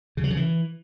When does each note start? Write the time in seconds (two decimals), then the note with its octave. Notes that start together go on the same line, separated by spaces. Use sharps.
0.17 C#3
0.24 F#3
0.30 C#3
0.37 E3